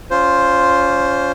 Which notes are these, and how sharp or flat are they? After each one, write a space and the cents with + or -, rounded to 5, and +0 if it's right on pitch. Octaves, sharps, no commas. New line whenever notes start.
C#4 +25 F4 +0 C5 +0